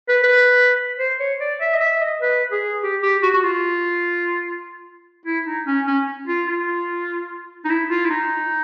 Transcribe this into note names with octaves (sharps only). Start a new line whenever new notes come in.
B4
B4
C5
C#5
D5
E5
D#5
E5
D#5
B4
G#4
G4
G4
F#4
F#4
F4
E4
D#4
C#4
C#4
F4
F4
D#4
E4
F4
E4
D#4